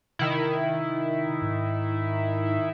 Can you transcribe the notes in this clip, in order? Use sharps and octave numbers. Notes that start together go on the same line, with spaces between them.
C3 D#3 E4
G#2